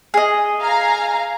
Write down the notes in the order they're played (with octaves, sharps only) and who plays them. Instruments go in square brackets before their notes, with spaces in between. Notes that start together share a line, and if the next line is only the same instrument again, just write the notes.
[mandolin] G#4 D#5
[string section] F5 G#5 A#5